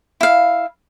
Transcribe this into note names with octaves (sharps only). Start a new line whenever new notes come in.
E4 F5